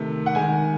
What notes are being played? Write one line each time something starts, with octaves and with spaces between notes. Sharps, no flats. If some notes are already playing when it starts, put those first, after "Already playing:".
Already playing: C3 D#3 A3
F#5
D#3 G#3 G#5